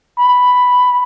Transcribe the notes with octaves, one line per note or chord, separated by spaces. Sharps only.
B5